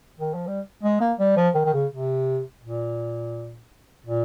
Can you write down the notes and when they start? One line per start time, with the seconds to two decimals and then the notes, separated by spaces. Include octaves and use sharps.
0.20 D#3
0.34 F3
0.47 G3
0.83 G#3
1.00 A#3
1.19 G3
1.37 F3
1.54 D#3
1.65 D#3
1.73 C#3
1.91 C3
2.63 A#2
4.06 A#2